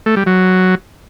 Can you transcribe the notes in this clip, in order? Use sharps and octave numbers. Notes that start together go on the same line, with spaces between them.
A3
G3
F#3